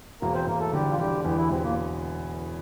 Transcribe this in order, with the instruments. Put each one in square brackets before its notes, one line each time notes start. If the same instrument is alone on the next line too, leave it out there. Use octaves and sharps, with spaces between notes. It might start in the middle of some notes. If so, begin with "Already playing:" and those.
[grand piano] E1 [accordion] A#3 A#4
[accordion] C4 C5
[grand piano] E1 [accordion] A#3 A#4
[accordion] A3 A4
[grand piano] D3 [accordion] G3 G4
[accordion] F4
[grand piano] D3 [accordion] G3 G4
[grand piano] E2 [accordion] G3 G4
[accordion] E3 E4
[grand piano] E1 [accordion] C3 C4
[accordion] A#2 A#3